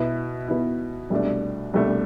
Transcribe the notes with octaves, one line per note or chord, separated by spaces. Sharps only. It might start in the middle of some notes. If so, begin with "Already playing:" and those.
Already playing: B2 B3 E4
B2 B3 E4
C2 B2 A3 D4
C2 B2 A3 D4